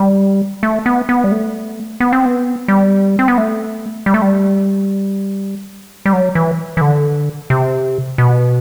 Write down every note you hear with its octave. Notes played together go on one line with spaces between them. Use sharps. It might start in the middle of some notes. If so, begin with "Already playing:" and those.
Already playing: G3
A3
B3
B3
G3
A3
B3
C4
B3
G3
C4
B3
A3
G3
A3
G3
G3
F#3
E3
E3
D3
C3
B2